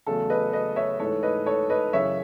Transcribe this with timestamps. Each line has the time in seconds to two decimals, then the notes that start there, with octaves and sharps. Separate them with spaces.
0.07 E2 C#3 F#3 A3 A4
0.30 B4 D#5
0.53 B4 D#5
0.76 C#5 E5
0.99 G#2 E3 A3 A4 C#5
1.23 B4 D#5
1.46 A4 C#5
1.70 B4 D#5
1.93 F#2 C#3 E3 C#5 E5